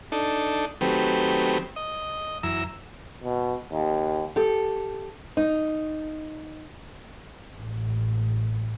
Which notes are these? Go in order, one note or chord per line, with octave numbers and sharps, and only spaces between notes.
D4 D#4 A4
D#3 F#3 A3 C4 G4 B4
D#5
F#2 E3 A#5 E6
B2
D#2
G4 A4
D#4
A1